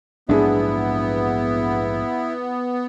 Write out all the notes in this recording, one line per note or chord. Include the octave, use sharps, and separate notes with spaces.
A#1 G#2 F#3 B3 D4 E4 G#4